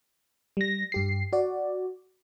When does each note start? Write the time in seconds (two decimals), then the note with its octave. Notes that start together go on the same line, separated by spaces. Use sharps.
0.57 G3 A#6
0.92 G2 G4 C7
1.33 F#4 D5